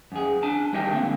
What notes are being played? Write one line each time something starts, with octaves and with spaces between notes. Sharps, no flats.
F#2 G#4
D4 G#5 A5
G3 D#4 G4 D#5 E5 G5
D3 A#3 C4